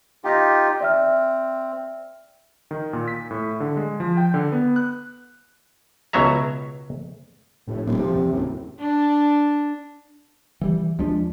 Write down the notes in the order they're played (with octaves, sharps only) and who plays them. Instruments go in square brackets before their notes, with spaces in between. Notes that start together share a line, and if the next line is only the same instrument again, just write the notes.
[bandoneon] D#4 F4 G4 [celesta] G5 A#6
[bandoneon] C4 [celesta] D5 E5 F6
[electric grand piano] D#3
A#2
B6
A2
D3
G#3
F3
G5
D3
B3
F#6
[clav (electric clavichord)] C#2 B2 F#3 C#5 E5 A#5
[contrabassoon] F1 [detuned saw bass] A2
[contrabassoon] D#1 [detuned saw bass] A#2
[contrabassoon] C3 [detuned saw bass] F3
[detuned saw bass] E2
[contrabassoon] F#1 [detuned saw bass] A2
[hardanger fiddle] D4
[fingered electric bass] E3 G3
[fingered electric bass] D#2 F3 [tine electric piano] G#3 D4